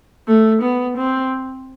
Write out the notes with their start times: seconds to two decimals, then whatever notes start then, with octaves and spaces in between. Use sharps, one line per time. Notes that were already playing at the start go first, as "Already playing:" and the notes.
0.28 A3
0.62 B3
0.97 C4